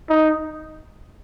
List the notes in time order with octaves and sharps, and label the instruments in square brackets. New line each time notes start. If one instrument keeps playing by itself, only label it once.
[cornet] D#4